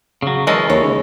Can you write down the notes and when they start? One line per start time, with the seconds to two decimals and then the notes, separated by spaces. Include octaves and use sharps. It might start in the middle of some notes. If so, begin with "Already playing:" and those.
0.22 C#3 F#3
0.47 E3 G#3 C#4 A4 A#4 D#5
0.70 D#2 C#5
0.83 C#3